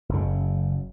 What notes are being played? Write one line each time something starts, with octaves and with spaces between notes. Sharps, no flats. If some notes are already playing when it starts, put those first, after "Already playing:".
F#1 F#2 C#3